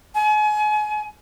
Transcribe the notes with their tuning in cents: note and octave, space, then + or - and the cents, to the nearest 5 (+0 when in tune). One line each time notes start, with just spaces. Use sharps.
G#5 +35